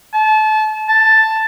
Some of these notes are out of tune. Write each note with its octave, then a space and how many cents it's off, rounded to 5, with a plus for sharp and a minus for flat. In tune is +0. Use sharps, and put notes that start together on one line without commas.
A5 -30
A5 +5